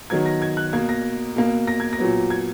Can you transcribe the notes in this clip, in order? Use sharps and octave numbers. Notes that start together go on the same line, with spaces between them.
D#3 F#3 B3 G#6
A#6
G#6
F#6
B2 A#3 G#6
A#6
B2 A#3
A#6
G#6
A#6
A#2 F#3 B3
G#6